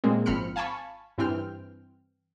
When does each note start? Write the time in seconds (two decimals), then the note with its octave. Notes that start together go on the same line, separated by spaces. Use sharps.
0.04 A#2 G#3 A#3 C4
0.26 G#1 F3 C4 B5 F6 C#7
0.56 F5 G#5 A5 B5 C#6
1.18 G2 E3 C4 G5 F6